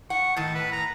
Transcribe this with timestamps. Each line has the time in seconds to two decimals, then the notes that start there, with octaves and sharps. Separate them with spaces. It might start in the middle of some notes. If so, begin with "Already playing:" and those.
0.10 F#5 C#6
0.37 A2 D#3 A5
0.54 B4
0.72 A#5